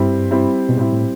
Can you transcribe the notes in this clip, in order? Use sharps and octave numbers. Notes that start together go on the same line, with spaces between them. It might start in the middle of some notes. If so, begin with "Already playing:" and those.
Already playing: G2 G3 C4 E4
G3 C4 E4
B2
A2 G3 C4 E4
A2